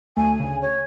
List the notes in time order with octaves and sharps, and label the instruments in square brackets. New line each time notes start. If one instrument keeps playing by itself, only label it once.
[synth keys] D2 A3 [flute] G#5
[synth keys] D2 C#3
[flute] C#5